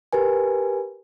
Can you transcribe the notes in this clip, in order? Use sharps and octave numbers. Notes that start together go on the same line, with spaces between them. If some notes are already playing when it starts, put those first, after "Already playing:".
G4 A#4 B4 G#5